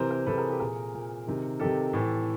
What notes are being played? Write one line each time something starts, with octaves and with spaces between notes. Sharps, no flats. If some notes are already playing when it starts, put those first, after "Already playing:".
Already playing: C3 E3 A#4 C5
A#4 C5
C3 E3 A4 B4
G#4 A#4
G4 A4
A#2 G#4 A#4
A#2
C3 D#3
C3 D#3 G4 A4
A2 E3